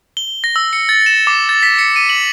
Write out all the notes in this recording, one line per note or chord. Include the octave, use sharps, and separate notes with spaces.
G7
A#6
E6
C#7
A6
E7
D6
A6
B6
C#7
D#7
F#7